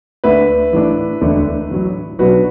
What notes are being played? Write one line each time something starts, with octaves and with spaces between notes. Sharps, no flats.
D2 D3 A3 D4 B4 E5
A1 A2 A3 D4
E1 D2 D3 A3 D4
A1 A2 F#3
B1 B2 F#3 D4 F#4 B4